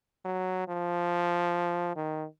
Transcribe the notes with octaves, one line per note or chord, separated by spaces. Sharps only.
F#3
F3
D#3